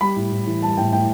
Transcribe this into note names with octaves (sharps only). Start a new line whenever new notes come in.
G3 B5
A2
A2
E3
G3 A5
A2 G5
A2 G5